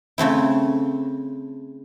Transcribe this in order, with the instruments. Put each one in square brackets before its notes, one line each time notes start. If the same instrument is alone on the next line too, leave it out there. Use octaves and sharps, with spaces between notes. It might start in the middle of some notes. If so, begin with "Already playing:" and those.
[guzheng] C#3 A3 C4 E4